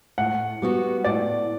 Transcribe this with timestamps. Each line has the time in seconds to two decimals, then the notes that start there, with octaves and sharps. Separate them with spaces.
0.18 A2 F#5
0.62 G3 B3 F#4
1.04 A2 D5